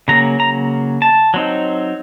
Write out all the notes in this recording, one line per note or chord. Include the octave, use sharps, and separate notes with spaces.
C#3 F#3 A#3 A#5
A#5
A5
F#3 C4 D#4